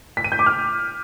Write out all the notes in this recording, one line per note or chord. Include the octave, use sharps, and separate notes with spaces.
B6
D#7
G6
D6
F6